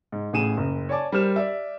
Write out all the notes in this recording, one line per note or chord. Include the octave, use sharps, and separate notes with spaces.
G#2
A1 A2 G#4 D#7 E7
F#1
C#5 D5 G#5 A5 D6
G3 A#4 C5 F6 E7
D5 E5